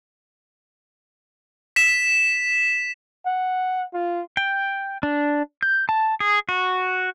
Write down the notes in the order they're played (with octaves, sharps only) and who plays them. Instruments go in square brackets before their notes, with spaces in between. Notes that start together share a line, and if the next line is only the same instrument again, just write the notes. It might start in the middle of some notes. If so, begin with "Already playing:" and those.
[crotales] B6 E7
[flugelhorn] F#5
F4
[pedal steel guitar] G5
D4
G6
A5
G#4
F#4